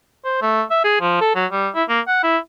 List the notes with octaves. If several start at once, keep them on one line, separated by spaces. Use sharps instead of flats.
C5
A3
E5
G#4
F3
A4
F#3
G3
E4
A#3
F#5
E4